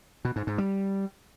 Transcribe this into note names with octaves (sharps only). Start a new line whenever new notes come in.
B2
G#2
G#2
G3